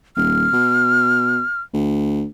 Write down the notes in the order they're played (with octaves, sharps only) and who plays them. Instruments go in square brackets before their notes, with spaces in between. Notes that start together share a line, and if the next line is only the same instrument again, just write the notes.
[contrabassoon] D#1 [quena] F6
[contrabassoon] B2
D2